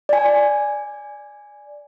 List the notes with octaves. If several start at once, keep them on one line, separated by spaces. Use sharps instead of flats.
D5 G#5